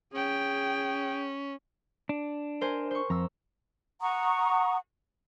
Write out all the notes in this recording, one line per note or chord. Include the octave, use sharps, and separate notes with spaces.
C#4 G#4 G5
D4
A#4 C5 G#5
C5 C#6
F2 A#5 E6
F#5 A#5 C#6 D#6